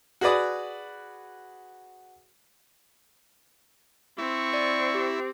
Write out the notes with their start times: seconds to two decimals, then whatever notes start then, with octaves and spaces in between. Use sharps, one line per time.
0.21 F#4 G#4 B4 D5 D#6
4.18 C4 E4 C#6
4.54 D5
4.95 G4